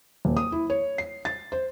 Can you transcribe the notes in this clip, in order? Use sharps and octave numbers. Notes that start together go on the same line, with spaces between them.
D#1
D#6
E4
C#5
C7
A6
C5